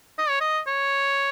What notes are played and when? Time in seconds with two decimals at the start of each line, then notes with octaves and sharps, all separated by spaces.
0.19 D#5
0.29 C#5
0.41 D#5
0.67 C#5